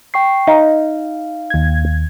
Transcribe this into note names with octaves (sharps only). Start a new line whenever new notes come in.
G5 C#6 C7
D#4 F5
D#2 G#6